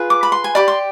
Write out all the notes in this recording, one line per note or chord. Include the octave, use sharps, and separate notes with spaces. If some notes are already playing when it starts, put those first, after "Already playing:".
Already playing: F4 G#4 B4
D6
B5
C6
G#5
G4 D5 B5
C6